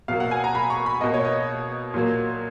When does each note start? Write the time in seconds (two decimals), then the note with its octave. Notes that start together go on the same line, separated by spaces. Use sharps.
0.08 B2 F#3 A#3 F5
0.20 F#5
0.31 G#5
0.44 A#5
0.55 B5
0.70 C#6
0.86 B5
1.01 B2 A#3 D#5
1.14 C#5
1.25 D#5
1.94 A#2 F#3 A#3